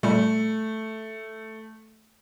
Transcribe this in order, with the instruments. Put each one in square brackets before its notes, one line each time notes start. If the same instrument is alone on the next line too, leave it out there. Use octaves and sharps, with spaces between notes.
[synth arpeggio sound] A#2 G3 [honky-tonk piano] A3